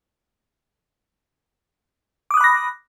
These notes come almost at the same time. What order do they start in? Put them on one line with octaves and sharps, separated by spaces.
D6 D#6 F#6 B5 A#6